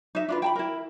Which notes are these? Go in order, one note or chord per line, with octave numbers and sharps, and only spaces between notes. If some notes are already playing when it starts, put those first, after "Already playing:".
D#4 E5
D4 F4 B4
G5 A5 B5
E4 A#4